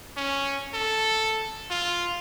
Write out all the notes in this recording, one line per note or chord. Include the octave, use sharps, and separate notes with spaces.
C#4
A4
F4